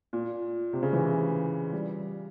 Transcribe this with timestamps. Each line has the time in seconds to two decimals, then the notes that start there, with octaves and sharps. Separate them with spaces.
0.13 A#2
0.73 C3
0.83 C#3
0.93 E3
1.73 G3